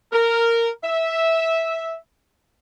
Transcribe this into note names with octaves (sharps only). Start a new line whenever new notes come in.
A#4
E5